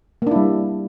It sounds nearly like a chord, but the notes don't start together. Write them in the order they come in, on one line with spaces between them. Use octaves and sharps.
A#3 D4 E4 G3